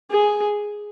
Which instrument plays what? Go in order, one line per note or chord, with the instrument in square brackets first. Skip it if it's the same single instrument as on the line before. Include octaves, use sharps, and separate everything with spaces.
[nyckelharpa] G#4